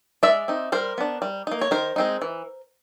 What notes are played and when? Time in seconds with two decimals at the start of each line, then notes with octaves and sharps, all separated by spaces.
0.23 G#3 D5 E5
0.48 C4 D#4
0.72 G3 A#4 C5
0.98 B3 D4
1.22 G3
1.47 A#3 D#4
1.61 C#5
1.71 D#3 A#4 C5
1.96 G#3 C4 D#4
2.22 E3